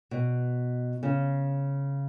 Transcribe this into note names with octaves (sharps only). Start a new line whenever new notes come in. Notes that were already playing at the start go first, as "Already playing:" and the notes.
B2
C#3